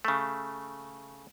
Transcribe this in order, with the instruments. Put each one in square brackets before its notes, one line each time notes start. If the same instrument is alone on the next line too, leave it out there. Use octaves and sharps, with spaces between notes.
[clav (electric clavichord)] C#3 A3